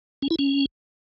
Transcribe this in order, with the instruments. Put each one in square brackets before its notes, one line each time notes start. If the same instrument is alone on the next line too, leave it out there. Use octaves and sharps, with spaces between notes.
[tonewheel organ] C#4
E4
C#4